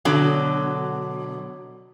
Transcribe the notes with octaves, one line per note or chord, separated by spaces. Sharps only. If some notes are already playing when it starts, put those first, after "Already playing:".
B2 D3 F#3